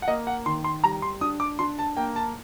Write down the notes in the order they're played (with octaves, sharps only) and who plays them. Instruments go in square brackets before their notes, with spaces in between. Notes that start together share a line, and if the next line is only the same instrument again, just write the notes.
[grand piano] F#5
A#3 D#5
F#5
D#3 C6
C6
G3 A#5
C6
D4 D#6
D6
D4 C6
A5
A#3 G5
A5